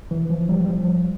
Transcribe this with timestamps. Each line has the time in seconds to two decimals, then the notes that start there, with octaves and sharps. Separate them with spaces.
0.11 E3
0.30 F3
0.49 G3
0.64 G3
0.69 F3